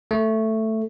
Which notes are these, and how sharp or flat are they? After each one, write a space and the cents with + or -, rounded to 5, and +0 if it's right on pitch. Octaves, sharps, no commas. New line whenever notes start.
A3 +5